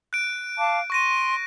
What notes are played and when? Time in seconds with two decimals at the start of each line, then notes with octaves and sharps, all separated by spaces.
0.13 F#6 D7
0.58 F5 A5 D6
0.90 C6 C#6 A#6 D#7